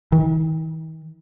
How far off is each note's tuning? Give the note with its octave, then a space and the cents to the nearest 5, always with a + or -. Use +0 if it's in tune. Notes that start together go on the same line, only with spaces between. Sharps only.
D#3 +45